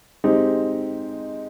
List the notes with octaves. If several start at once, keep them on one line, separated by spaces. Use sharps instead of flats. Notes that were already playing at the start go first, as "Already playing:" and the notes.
G#3 C4 D#4 G4